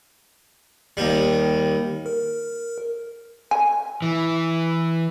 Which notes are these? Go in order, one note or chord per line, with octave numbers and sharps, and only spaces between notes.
D#2 G3
A#4
G#5
E3